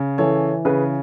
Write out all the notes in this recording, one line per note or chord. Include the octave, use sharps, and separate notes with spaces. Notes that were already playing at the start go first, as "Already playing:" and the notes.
Already playing: C#3
E3 A4 C#5
C#3 G#4 B4